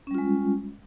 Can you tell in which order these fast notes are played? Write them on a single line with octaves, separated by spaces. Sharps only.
C#4 G3 F4 G#3